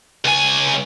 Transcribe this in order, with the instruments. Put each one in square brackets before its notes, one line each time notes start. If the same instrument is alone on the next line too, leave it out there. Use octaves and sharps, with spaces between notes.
[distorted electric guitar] C#2 G#5